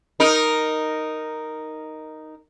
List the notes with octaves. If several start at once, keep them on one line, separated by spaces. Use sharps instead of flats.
D#4 A#4